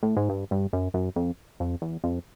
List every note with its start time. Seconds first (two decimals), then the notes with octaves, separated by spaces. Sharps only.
0.03 A2
0.17 G#2
0.29 G2
0.51 G2
0.73 F#2
0.94 F#2
1.16 F2
1.60 F2
1.82 E2
2.04 F2